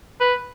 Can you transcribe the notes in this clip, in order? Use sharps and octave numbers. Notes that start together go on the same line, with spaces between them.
B4